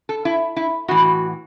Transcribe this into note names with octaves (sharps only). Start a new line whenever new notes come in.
A4
E4
E4
A2 E3 F#4